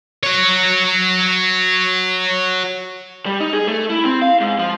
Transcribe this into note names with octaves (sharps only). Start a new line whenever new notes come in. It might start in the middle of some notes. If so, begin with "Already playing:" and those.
F#4 C#5
G3
D#4
G#4
A3
E4
C4
F5
G#2
F3